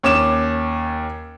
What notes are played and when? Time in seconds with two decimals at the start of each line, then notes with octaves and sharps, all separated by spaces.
0.03 D#2 C#4 D6 E7